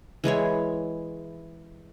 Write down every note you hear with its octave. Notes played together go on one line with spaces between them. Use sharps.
E3 G#3 E4 C#5